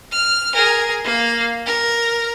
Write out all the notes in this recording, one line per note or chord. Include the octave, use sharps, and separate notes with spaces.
F6
G#4 A#4
A#3 F5
A#4